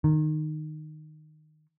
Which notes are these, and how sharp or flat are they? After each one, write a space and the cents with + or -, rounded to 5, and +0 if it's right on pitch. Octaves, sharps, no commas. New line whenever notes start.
D#3 -15